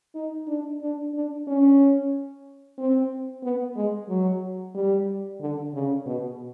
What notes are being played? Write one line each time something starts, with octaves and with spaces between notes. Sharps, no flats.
D#4
D4
D4
D4
C#4
C4
B3
G#3
F#3
G3
D3
C#3
B2